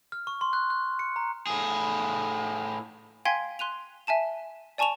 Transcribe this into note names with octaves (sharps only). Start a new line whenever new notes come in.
F6
C#6
C6
F#6
F#6
C#7
A#5
A2 G#4
F5 G5 G#5 C6 G#6 B6
C6 F#6 D#7 F7
E5 G#5 A5 E7
D5 G#5 A5 C#6 E7 F7